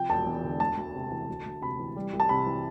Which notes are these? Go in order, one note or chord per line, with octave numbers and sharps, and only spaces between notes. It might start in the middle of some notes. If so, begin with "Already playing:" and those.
Already playing: C3 F3 G5
E1 A5
E2
D3
D2 A5
D2
C3
E3
D2
D2
C3 B5
E3
G3
C2
A5
C3 B5
E3